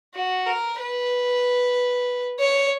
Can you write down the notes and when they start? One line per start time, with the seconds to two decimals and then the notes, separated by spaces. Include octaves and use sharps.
0.15 F#4
0.46 A#4
0.79 B4
2.39 C#5